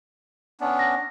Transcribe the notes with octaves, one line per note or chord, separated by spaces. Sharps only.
B3 C#4 D4
A#6